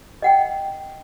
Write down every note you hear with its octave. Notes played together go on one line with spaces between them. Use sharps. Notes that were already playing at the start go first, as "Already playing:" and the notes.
D#5 F#5 G5